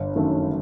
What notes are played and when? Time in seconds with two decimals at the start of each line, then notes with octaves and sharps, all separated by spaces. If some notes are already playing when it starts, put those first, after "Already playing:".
Already playing: G1
0.16 F#2 D#3 A3